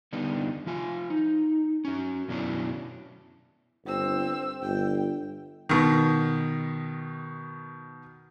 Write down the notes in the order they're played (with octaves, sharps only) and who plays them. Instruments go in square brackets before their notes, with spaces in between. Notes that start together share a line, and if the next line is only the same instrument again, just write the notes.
[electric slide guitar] D3 G3 B3 D4 D#4
F3 F4 G#5
D#4
C#4 F#4
F#2 B2 F#3 C#4 D4 E4
[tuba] G1 [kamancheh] C4 E6
[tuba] G1 [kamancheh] G5
[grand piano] B2 D#3